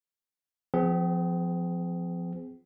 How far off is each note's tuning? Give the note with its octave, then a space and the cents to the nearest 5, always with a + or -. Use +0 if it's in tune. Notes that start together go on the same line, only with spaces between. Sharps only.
F3 +0 C4 -40 G#4 +5